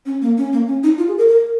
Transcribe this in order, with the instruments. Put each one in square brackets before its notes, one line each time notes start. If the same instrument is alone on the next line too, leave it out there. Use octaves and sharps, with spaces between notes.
[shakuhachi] C#4
A#3
C#4
A#3
C#4
D#4
F4
G#4
A#4
A#4